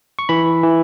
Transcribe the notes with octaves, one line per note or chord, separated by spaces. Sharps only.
C#6
E3 B5
E3